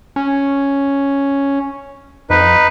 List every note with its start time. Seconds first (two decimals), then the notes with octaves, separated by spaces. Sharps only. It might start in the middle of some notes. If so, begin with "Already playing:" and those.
0.16 C#4
2.30 F2 D#4 B4